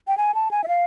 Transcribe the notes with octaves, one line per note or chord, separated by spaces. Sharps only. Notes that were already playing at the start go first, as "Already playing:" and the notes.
G5
G#5
A5
G#5
E5
F5